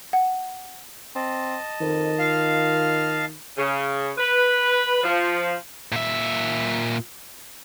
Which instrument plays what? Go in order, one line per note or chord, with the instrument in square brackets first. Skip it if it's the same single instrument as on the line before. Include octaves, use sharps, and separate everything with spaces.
[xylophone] F#5
[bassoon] C4 [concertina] D#5 A5
[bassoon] F2 [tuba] D#3
[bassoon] F4 [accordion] F5
[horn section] C#3
B4
F3
[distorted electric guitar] A#2 E5